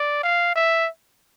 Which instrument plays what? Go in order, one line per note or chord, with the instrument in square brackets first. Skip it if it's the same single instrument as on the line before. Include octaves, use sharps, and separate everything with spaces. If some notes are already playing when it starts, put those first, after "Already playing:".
Already playing: [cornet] D5
F5
E5